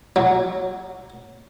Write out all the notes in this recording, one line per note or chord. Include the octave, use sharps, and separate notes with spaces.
F#3